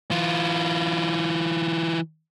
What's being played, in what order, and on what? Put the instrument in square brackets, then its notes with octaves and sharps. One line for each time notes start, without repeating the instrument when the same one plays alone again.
[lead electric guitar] E3 F4